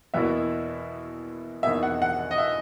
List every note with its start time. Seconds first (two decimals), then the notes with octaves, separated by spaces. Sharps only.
0.14 E2 B2 A#3 E4 E5
1.63 E2 B2 A#3 D#4 G#4 E5
1.83 F#5
2.02 F#5
2.31 D#5
2.38 E5